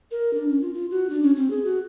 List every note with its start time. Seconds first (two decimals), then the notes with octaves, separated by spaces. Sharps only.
0.11 A#4
0.34 D4
0.49 C#4
0.62 F4
0.74 F4
0.91 F#4
1.10 D4
1.23 C#4
1.37 C4
1.50 G#4
1.65 F#4